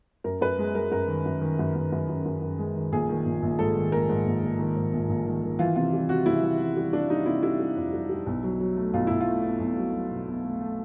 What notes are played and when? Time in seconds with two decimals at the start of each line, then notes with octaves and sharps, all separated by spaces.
0.24 F#2 A#4
0.41 F#2 B4
0.59 G#3
0.75 G#3 A#4
0.91 F#2 A#4
1.08 D#3
1.26 F#2
1.41 D#3
1.59 F#2
1.75 F#2
1.92 F#2
2.09 F#2
2.25 F#2
2.42 F#2
2.58 G#3
2.76 D#3
2.92 A#1 G#4
3.09 D#3
3.25 A#1
3.42 A#1
3.59 G#2 A4
3.75 D#3
3.92 A#1 A#4
4.09 G#2
4.26 A#1
4.42 A#1
4.59 D#3
4.77 G#2
4.93 A#1
5.09 A#1
5.26 D#3
5.43 D#3
5.59 E3 F4
5.76 C3 F4
5.93 G3
6.09 C3 F#4
6.26 C3 E4
6.43 E3
6.59 E3
6.77 G3
6.93 G3 D4
7.10 G3 D#4
7.26 C3 E4
7.43 G3 E4
7.59 G3
7.77 F2
7.93 G3
8.09 G3
8.26 B1
8.44 F#3
8.60 F#3
8.77 A3
8.94 B1 F4
9.07 B1 E4
9.21 F4
9.27 A3
9.44 B2
9.60 B1
9.77 F#3
9.94 F#3
10.11 B2
10.27 B2
10.44 A3
10.61 A3